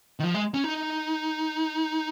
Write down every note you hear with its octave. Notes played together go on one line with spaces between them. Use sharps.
D#3
F3
G#3
C#4
D#4